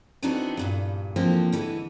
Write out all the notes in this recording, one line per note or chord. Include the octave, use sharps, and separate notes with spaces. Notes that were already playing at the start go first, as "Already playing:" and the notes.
E3 B3 C4 D4 D#4 F#4
E2 G2 A#2
D3 E3 F3 A#3 C4
D3 E3 G#3